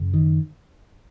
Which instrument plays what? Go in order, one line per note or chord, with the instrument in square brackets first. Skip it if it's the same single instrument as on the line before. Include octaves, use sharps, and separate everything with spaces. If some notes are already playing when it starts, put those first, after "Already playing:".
Already playing: [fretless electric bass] F#2 C#3
D#3